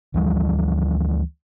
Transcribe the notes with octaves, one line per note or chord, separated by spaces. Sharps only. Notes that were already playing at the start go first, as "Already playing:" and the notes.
D2 E3 F3 G3